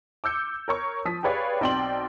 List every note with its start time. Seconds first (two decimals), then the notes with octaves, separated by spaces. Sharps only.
0.24 D6 E6 G6 C#7
0.68 A#4 C#5 C#6
1.05 F3 D#6 B6
1.23 G4 G#4 B4 C#5 D5 F5
1.61 B1 C4 D5 G5 C6 F#7